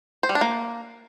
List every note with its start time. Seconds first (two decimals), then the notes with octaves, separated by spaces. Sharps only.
0.23 C5
0.29 G3
0.35 D4
0.41 A#3